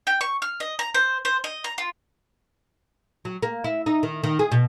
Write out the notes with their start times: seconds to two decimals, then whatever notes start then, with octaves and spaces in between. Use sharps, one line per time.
0.07 G5
0.21 C#6
0.42 F6
0.60 D#5
0.79 A#5
0.94 C5
1.25 C5
1.44 D#5
1.64 A#5
1.78 F4
3.25 F#3
3.43 A#3
3.64 E4
3.86 D#4
4.03 D#3
4.24 D#3
4.39 G#4
4.52 B2